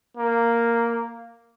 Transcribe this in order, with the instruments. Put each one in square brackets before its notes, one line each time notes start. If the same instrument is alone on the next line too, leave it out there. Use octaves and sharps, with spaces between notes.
[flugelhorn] A#3